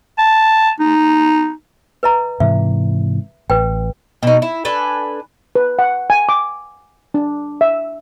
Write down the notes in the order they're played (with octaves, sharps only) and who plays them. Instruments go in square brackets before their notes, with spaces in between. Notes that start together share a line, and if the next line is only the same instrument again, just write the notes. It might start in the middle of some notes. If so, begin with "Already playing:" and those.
[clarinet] A5
D#4
[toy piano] B4 D#5 A#5
[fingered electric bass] G#2 C3 E3 [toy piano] E5
[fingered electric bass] A1 [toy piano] B4 G5
[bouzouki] B2 D#4
E4
D4 A4 B4 G#5
[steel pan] B4
F#5
G#5
D6
D4
E5